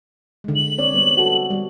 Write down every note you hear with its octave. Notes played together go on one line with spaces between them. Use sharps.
D3 G#3
F#7
C4 C#5 D5
G3 B3
F#4 A4
G3